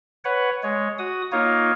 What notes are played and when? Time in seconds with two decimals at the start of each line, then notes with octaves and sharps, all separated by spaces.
0.25 B4 C#5 F#5
0.63 G#3 C#5
0.99 F#4 D#6
1.32 A#3 D#4 F4 C#5